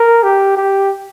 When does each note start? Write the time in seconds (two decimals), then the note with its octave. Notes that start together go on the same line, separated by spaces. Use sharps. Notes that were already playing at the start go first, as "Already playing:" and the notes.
Already playing: A#4
0.23 G4
0.57 G4